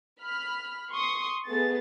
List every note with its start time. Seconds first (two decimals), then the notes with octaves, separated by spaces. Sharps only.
0.21 B5 F6
0.92 C6 C#6 D#6
1.48 A3 B3 G#4 A6